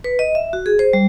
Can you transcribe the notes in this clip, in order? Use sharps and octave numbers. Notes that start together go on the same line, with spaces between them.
B4
D#5
E5
F#4
G#4
C5
G3